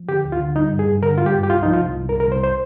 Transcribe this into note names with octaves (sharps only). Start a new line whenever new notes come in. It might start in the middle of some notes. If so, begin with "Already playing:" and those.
Already playing: F3
D3 G4
D2
F4
D3
G3 D#4
G2
G#4
G2
D3 A#4
G3 F4
G4
G2
G4
C2 F4
F3 D#4
F4
C2
C2
A#4
C2
A#4
C2 C5
C5